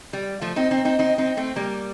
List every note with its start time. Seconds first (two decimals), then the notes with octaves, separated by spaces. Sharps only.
0.13 G3
0.41 F3 A3
0.56 C4 D#4
0.71 C4 D#4
0.85 C4 D#4
0.99 C4 D#4
1.18 C4 D#4
1.37 A3 C4
1.56 G3 A#3